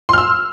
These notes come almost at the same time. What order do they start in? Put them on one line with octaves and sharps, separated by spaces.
C6 F6 E6